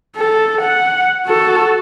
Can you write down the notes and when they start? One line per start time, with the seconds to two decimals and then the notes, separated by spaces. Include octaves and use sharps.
0.16 A4
0.61 F#5
1.26 F#4 A4